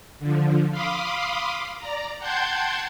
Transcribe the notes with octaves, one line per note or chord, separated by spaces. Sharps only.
D3 F3
F5 B5 C6 D6 D#6
D5 A#5
F#5 G5 A5 C6 G6 G#6